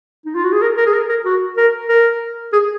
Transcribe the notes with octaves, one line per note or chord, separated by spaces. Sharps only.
D#4
F4
F#4
G#4
A#4
A#4
G#4
A#4
A#4
F#4
A#4
A#4
G#4